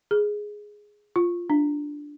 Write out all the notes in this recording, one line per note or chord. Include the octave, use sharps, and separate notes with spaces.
G#4
F4
D4